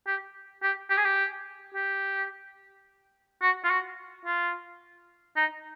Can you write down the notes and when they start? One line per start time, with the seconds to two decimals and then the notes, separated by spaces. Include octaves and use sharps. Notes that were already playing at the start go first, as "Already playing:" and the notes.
0.07 G4
0.63 G4
0.90 G4
0.97 G#4
1.05 G4
1.74 G4
3.42 F#4
3.64 F4
3.70 F#4
4.25 F4
5.36 D#4